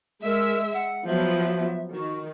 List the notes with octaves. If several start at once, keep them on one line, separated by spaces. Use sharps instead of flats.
G#3 A#4 E5
F#5
F3 F#3 B3 E5
D#3 F#4